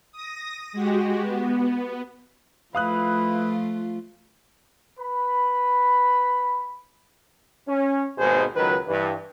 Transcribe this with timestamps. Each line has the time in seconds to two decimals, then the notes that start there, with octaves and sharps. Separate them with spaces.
0.12 D#6 A#6
0.73 G#3 F#4 G4
1.22 B3
2.75 F3 A3 E4 F4 B4 F5 D#6 F#6
4.99 B4 B5
7.68 C#4
8.18 G#1 D#2 B2 G#3 G#4 C5
8.56 C#2 D#3 F#3 B4
8.88 G2 E3